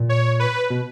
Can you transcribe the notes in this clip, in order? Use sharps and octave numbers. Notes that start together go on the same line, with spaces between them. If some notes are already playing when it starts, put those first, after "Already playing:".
Already playing: A#2
C#5
B4
B2